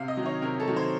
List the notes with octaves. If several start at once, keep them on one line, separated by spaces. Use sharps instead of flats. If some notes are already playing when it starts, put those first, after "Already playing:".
Already playing: C3 F5
D#5
D#3 F#3
C#5
C3 A#4
A4
D#3 F#3
C5